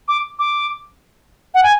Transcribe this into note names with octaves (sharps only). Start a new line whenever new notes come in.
D6
D6
F#5
G#5